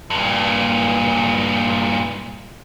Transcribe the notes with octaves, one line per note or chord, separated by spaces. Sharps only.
G2 A#2